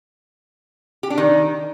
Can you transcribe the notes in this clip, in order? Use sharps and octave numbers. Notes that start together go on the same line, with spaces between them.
G4
D4
D#3